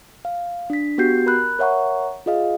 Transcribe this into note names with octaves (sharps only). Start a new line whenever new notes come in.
F5
D4 B6
B3 F#4 G4 G6 C7
A#4 B5 F#6
A#4 C#5 E5 F#5 A#5 C#6
F4 G#4 D#5 F5